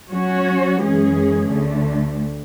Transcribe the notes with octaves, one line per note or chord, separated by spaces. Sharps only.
F#3 C#4 F#4 C#5
F#2 E3 G#3 C#4 G#4
D2 D3 A3